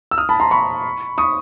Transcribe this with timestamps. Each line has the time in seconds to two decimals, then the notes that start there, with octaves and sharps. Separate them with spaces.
0.11 E6
0.18 D#6 F6
0.29 A5 B5
0.40 A#5 C6
0.51 B5 C#6
1.18 C#6 D#6